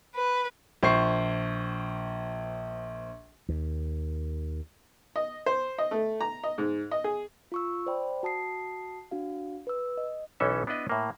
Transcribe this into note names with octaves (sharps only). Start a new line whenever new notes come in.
B4
A#1 C5 C#6 C7
D#2
D#5
C5
D#5
A3
A#5
D#5
G#2
D#5
G#4
F4 C#6 E6
C5 D5 G5 B5
F#4 A5 D#6 C7
D4 F#4 F5
B4 E6
D#5
B1 E3 C#4 A4 E5
B3 D4 E4 B4 D#5
A2 A#3